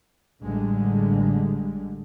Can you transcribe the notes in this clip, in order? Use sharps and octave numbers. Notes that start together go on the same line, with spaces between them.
A1 D3 G3 G#3